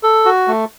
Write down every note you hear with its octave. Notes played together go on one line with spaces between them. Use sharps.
A4
F#4
A3